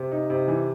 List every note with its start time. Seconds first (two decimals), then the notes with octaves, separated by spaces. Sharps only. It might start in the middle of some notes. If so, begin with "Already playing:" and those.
Already playing: C3
0.11 D#4
0.30 C3
0.48 E3